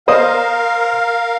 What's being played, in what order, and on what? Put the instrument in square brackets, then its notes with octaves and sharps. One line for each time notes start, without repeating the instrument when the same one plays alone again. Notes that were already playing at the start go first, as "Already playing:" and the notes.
[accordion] A#4 F5 [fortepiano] C5 D#5 D#6